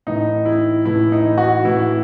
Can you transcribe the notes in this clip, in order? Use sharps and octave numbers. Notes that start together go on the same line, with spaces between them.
A2 E3 D#4
E4
A2 E3 E4
D#4
F#4
A2 E3 E4